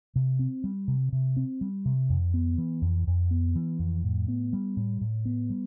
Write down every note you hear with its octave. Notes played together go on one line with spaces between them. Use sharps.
C3
C4
G3
C3
C3
C4
G3
C3
F2
B3
E3
F2
F2
B3
E3
F2
A2
B3
G3
A2
A2
B3
G3